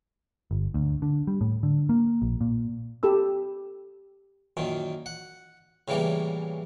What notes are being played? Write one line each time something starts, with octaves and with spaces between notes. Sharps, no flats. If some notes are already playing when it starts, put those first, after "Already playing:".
G1
D2
D3
G3
A2
D3
A#3
A#1
A#2
G4 A4 B5 E6
F#2 A#2 D#3
F#5
A2 C#3 E3 G3 A#3